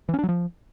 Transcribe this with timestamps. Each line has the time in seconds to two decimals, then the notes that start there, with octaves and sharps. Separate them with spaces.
0.09 E3
0.14 C#4
0.19 D4
0.24 F#3
0.29 F3